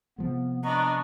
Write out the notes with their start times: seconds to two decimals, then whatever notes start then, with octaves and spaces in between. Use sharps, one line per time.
0.18 C3 F3 G#3 B3
0.64 B3 D4 D#5 A#5 C#6